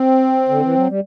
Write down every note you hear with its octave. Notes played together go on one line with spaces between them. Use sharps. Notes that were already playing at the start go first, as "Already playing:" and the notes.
Already playing: C4
D3
E3
F#3
G3